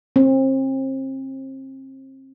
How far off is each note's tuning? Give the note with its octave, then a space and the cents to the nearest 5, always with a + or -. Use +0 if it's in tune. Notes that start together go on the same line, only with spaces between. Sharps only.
C4 +35